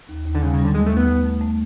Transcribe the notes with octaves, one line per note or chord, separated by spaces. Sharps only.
D#2
D#2
D3
C#3 G3
C#3
G3
D3
D#2 G#3
A3
D#2 B3
A3
A3
A3